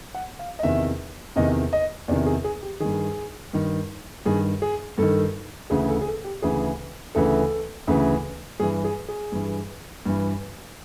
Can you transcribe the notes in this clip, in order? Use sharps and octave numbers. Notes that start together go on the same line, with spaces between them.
F#5
F5
D#5
E2 C3 D#3 E5
E2 C3 D#3 D#5
D#5
E2 C3 D#3 D5
G#4
G#4
G4
G2 D#3 G#4
G2 D#3
G2 D#3 G#4
G#4
G2 D#3 A4
D2 C#3 E3 G#4
A4
G#4
A4
G4
D2 C#3 E3 G#4
D2 C#3 E3 A4
D2 C#3 E3
G2 E3 G#4
G#4
G#4
G2 E3
G2 E3